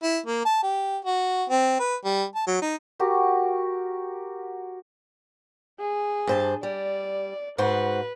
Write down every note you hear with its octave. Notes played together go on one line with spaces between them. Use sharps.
E4
A#3
A5
G4
F#4
C4
B4
G3
A5
F#3
D#4
F#4 G4 A#4
G#4
G2 C5 A5
G3 D5
G#2 F#4 B4 C5